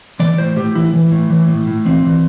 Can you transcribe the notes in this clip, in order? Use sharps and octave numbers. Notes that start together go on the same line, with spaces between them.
E3 D5
A2 C5
A2 G4
E3 E4
E3
A2
E3
A2
A2
E3 C4
E3